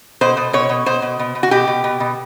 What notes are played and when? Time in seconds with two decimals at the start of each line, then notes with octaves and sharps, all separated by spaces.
0.21 B2 C5
0.37 B2
0.53 B2 C#5
0.69 B2
0.86 B2 C5
1.02 B2
1.19 B2
1.35 B2
1.43 F#4
1.51 B2 G4
1.68 B2
1.84 B2
2.00 B2